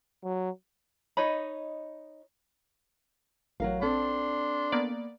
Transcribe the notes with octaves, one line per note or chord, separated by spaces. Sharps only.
F#3
D#4 C#5 D#5 B5
A1 F#3 A#4 F5
C4 D4 A4 C6
A#3 B3 D5